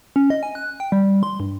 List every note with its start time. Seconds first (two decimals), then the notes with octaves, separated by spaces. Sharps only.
0.16 C#4
0.30 D#5
0.43 G#5
0.55 F#6
0.80 G5
0.92 G3
1.23 C6
1.40 G2